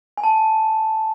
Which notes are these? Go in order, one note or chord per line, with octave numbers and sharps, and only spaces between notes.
G#5
A5